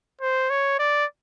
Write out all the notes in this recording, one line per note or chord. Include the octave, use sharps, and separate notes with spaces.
C5
C#5
D5